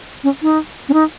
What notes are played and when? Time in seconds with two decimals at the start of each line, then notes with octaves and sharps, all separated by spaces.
0.24 C#4
0.42 D#4
0.89 C#4
0.93 D#4